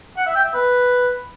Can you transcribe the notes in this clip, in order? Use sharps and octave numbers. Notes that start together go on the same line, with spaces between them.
F#5
E5
G5
E5
B4